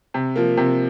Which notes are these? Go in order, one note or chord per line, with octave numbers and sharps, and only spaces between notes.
C3
F3 A#3
C3